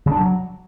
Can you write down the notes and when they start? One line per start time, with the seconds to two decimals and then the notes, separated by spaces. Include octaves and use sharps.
0.06 C#3
0.11 D4
0.17 F#3